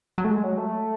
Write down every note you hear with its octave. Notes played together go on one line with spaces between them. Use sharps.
F#3
A3
G#3
F#3
A3